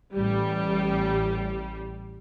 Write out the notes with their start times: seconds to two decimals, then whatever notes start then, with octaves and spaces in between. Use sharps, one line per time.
0.15 A1 G3